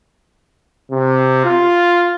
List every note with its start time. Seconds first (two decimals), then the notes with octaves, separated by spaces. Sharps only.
0.91 C3
1.45 F4